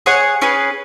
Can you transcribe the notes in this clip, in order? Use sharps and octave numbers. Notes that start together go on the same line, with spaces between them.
G#4 C#5 F#5
C#4 G#4 B4